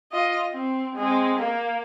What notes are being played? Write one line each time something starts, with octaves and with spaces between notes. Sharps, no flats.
F4 D#5
C4
G#3 C4
A#3